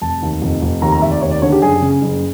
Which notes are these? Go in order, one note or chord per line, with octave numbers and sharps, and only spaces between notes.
F1 A5
D#2
F1
F1
D#2 A#5
A#5
F1 E5
D5
D#2 C#5
D5
D3 C#5
G4
F#1 G#4
C#3
F#1